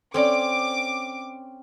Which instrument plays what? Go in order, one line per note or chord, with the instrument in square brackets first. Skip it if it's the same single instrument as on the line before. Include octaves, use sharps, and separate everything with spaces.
[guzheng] C4 C#4 [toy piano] A4 D5 [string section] D6